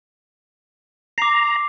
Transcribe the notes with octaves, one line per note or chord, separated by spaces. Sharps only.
A#5 D6 C7